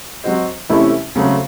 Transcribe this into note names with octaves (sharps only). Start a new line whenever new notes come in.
F#3 C4 F#4 C5 D#5
C3 E3 A3 C#4 E4
C#3 F#3 A3 C4